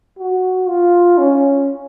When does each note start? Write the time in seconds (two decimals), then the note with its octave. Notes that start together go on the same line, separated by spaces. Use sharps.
0.19 F#4
0.68 F4
1.18 C#4